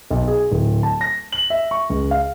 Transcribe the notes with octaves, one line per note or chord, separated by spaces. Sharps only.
B1
G#4
D1
A5
A#6
F#7
E5
C#6
C#2
F5